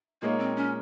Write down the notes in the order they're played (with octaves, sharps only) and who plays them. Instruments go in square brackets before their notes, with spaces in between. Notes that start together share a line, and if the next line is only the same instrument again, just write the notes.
[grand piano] A#2 G#3 D#4 A#4 C#5 [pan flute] A#3
[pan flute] C4
C#4